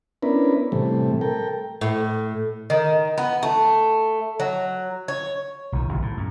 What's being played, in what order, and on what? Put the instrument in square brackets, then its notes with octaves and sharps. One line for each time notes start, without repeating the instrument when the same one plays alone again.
[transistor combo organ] B3 C#4 D4 E4 A#4 B4
A2 C3 E3 G3 A3
A4 A#4 G5
[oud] A2
[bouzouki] D#3
B3
A3
F#3
C#5
[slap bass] B1 D#3
F#1 D#2
A2
F#2